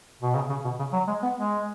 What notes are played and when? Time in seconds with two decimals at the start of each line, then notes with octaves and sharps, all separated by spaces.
0.22 B2
0.35 C#3
0.50 C#3
0.65 B2
0.79 C#3
0.93 F#3
1.08 G#3
1.23 B3
1.37 G#3